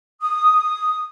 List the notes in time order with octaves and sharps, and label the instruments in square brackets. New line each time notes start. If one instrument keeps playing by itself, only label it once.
[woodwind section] D#6